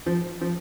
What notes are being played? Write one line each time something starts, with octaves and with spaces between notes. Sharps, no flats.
F3
F3